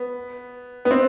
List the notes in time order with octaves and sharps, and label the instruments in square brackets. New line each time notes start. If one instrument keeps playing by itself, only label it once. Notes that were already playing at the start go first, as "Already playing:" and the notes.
Already playing: [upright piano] B3
B3
C4